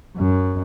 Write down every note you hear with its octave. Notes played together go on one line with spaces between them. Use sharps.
F#2